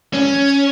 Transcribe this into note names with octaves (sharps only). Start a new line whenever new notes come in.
C#4